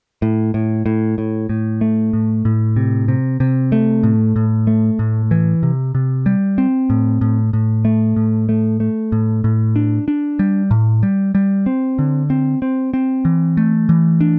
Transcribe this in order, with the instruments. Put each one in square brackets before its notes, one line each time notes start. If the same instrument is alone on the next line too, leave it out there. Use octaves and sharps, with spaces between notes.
[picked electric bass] A2
A2
A2
A2
A2
A3
A2
A2
C3
C3
C3
A3
A2
A2
A3
A2
E3
C3
C3
G3
C4
A2
A2
A2
A3
A2
A3
A3
A2
A2
D4
D4
G3
A2
G3
G3
C4
D3
C4
C4
C4
E3
A3
E3
D4